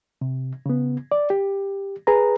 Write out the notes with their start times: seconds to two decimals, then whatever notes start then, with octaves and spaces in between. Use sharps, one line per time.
0.21 C3
0.66 C#3 B3
1.12 D5
1.30 G4
2.07 G#4 B4 A#5